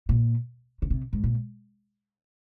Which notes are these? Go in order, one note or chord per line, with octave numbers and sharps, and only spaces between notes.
A#2
C#3
C3
G#2
A#2